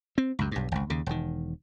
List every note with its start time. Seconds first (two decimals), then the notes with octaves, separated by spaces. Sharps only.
0.18 C4
0.39 C#2 F#2
0.51 B1 G2
0.72 G#1 C#2
0.90 D#2 C#3
1.06 E1 D#3